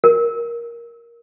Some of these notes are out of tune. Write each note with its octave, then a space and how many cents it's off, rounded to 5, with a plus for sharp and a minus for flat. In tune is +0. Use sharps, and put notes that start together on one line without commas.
A#4 +10